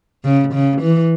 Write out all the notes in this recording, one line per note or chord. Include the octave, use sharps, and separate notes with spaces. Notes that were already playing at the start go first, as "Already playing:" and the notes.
C#3
C#3
E3